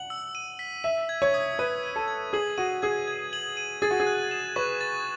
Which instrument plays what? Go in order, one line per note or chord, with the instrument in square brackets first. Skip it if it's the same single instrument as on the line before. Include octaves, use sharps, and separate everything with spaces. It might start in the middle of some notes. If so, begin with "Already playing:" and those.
Already playing: [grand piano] F#5 [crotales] F#7
[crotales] E6
D#7
B6
[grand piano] E5 [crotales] D#7
[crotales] G#6
[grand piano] C#5
[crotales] D#6
[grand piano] B4 [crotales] D#6
[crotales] D#7
[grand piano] A4
[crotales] G#6
[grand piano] G#4 [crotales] F#7
[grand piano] F#4 [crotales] D#7
[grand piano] G#4 [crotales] G#6
[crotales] G#6
F#7
D#7
[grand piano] G#4 [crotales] A6
[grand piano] F#4
G#4
[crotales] F#6
E7
[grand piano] B4 [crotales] C#6
[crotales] A6